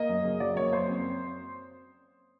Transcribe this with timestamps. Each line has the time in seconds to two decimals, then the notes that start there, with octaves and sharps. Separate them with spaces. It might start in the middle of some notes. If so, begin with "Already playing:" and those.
Already playing: A#3 D#5
0.09 F#2
0.24 C#3
0.40 F#3 D5
0.56 A#3 C#5
0.72 F#2 C5
0.88 C4